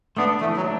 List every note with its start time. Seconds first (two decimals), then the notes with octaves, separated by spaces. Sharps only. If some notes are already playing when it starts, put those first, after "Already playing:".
0.17 A3 B3 D4
0.41 E3 A3
0.56 F#3
0.64 A3 D4